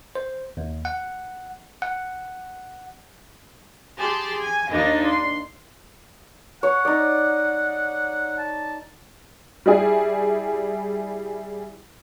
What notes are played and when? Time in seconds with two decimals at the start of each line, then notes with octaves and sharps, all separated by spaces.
0.15 C5
0.57 D#2
0.85 F#5
1.82 F#5
3.99 G4 G#4 A5 C6
4.40 G#5
4.70 D#2 D4 D#4 D#5
5.06 C6
6.63 C#5 F#5
6.85 D#4 D5
8.38 A5
9.66 G3 E4 G#4